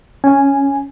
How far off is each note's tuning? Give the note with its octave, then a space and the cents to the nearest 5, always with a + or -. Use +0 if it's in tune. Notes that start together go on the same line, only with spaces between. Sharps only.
C#4 +5 G#5 +0